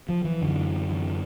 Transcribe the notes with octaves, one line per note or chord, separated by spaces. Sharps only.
F3
E3
F#2 D3
E3